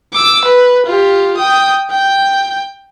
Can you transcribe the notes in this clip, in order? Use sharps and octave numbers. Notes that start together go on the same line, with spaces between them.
D6 E6
B4
F4 G4
G5 D#6
G5